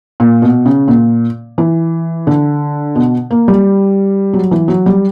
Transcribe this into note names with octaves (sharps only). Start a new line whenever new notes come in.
A#2
B2
C#3
A#2
E3
D3
B2
A#3
G3
F#3
E3
F#3
G3